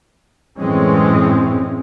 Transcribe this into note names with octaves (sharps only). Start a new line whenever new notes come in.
F#2 A2 E3 G#3 C4 C#4